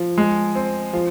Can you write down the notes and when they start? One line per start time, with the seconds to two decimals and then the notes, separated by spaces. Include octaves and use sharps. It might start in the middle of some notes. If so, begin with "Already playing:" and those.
Already playing: F3
0.18 G#3
0.55 C4
0.93 F3